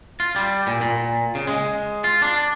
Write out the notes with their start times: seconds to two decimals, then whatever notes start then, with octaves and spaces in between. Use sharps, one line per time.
0.20 F4
0.36 G3
0.67 A#2
0.81 A#2
1.35 C#3
1.47 G#3
2.04 F4
2.22 D4